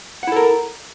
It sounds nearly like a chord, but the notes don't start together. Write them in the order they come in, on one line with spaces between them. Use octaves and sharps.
F#5 E4 A4 A#4